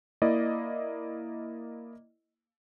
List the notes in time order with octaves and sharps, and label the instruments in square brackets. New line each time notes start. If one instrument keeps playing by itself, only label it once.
[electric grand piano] A#3 E4 D5 D#5